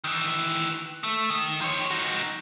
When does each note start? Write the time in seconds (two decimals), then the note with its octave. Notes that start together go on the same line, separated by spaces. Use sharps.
0.04 D#3 E3
1.03 A3
1.30 D#3
1.61 F3 C#5
1.91 D#4 F#4